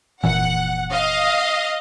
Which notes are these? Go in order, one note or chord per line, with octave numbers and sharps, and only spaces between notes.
F1 A#2 E3 F#5
D#5 F5